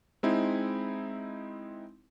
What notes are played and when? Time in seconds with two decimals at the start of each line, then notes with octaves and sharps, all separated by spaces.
0.23 G#3 C4 D#4 E4